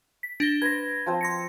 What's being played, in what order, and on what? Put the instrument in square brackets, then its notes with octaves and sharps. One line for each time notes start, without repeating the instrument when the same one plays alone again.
[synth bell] B6
D4 A#6 G7
[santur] B4 C5 [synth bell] G#6 A#6
[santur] F3 C4 C5
[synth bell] C6 A#6 C#7